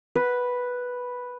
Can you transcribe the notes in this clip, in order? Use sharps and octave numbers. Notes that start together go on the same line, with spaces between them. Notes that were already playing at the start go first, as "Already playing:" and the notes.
B4